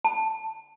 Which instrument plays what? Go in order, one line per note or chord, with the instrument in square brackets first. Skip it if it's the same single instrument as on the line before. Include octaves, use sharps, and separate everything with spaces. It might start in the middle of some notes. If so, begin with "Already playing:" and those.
[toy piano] A5